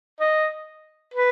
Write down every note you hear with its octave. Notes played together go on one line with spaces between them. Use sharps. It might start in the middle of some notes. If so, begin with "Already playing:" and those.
D#5
B4